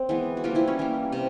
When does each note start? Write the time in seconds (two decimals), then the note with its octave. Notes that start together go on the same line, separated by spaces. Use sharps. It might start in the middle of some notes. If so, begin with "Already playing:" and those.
Already playing: C4
0.09 E3 G#3 B3
0.37 F#4
0.44 E3 F3 G3 A#3 F4
0.55 E3 E4
0.68 C#4
0.79 E3 G3 A#3
1.12 C3